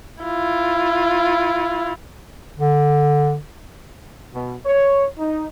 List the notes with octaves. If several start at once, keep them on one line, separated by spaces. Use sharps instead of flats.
E4 F4
D3
B2
C#5
D#4